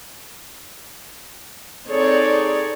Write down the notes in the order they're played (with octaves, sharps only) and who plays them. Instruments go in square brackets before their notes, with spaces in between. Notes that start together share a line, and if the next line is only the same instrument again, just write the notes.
[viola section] C4 D#4 G#4 A4 C#5 D5